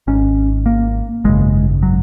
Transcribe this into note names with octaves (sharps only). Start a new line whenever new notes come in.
G#1 G#2 C#4
A#3
G#1 F#2 C#3 G#3
F#3